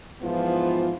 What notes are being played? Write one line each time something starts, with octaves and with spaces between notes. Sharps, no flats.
G#2 E3 F3 B3 F4